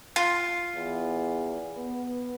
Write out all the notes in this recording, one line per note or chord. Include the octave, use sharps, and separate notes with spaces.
F4
E2
B3